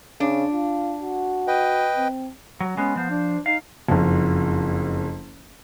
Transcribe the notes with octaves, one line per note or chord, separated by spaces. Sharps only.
C#3 D4
F4
F#4
B4 D#5 G5
C4
F#3
G#3 B3 C#4
F3 B3 C5
D4
D#4 F5
F#1 F2